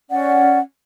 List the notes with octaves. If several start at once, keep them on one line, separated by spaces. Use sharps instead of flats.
C#4 D5 F#5